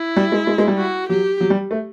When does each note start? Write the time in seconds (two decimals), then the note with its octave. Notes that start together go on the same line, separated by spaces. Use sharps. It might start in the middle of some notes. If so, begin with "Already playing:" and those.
Already playing: E4
0.16 G3
0.32 G#3
0.47 G#3
0.58 G#3
0.68 G3
0.78 F#4
1.09 F#3 G4
1.40 F#3
1.50 G3
1.71 A3